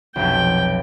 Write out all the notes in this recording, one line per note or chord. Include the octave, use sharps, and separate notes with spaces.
F1 B1 G5